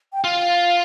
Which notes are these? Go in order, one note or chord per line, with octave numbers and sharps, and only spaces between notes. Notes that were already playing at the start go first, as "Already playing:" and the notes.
G5
F4 F5